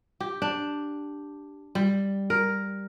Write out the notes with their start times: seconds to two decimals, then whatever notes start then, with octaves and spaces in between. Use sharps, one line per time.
0.20 G4
0.42 D4
1.75 G3
2.30 A#4